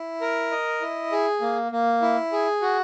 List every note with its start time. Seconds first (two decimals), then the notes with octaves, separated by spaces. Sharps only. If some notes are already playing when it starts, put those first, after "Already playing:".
Already playing: E4
0.21 A#4
0.52 D#5
0.81 E4
1.12 G#4
1.41 A#3
1.72 A#3
2.02 E4
2.32 G#4
2.62 F#4